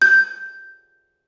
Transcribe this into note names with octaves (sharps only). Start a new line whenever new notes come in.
G6